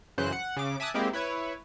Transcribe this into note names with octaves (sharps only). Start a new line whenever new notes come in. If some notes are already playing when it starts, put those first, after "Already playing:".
F#2 C#3 E3 F#3 C5 F#6
F#5
C#3 D6
E5 G#5 A5 D6 D#6 F#6
G#3 A#3 C4 E4 G4
E4 B4 C#5